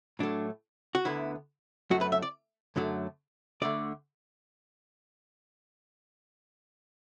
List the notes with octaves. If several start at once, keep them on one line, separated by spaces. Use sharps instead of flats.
A2 F#3 A3 D4
F#4
D2 D3 B3 E4
F#2 F#3 A3 F#4
B4
E5
D5
F#2 D3 F#3 A3
D2 D3 A3 D5